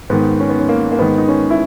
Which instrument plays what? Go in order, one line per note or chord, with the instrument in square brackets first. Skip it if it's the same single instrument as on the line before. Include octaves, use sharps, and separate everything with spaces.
[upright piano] G#2 D#3 B3
C#4
B3
C#4
A#3
A#3
G#2 D#3 B3
D#4
C#4
E4